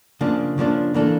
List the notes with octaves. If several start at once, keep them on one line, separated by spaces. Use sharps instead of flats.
C#3 F3 A#3 D4
C#3 F3 A#3 D4
E3 A#3 D4 A4